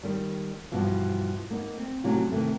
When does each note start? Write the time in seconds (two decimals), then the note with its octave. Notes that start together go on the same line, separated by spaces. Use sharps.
0.03 D#3 G3
0.72 G2 B2 E3 F3
1.50 A#3 B3 D#4
1.78 C4
2.04 A2 C3 F#3 C#4 D#4 G4
2.31 C3 D#3 E3 A3